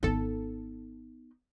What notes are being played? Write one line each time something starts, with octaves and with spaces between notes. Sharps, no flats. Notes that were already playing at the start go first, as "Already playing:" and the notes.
G#1 B3 D#4 A4